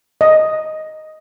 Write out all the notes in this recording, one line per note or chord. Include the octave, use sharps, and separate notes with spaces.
D#5